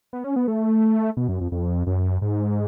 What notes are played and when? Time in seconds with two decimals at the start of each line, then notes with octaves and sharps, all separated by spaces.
0.13 B3
0.24 C#4
0.36 B3
0.48 A3
1.17 B2
1.29 F#2
1.41 F2
1.52 F2
1.87 F#2
2.22 G#2